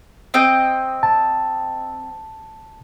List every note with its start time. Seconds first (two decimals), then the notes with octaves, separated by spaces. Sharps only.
0.34 C4 D#5 G5
1.03 A5